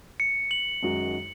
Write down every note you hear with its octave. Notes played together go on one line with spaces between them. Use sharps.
C#7
F#7
F#2 D#3 G#3 D#4 F#4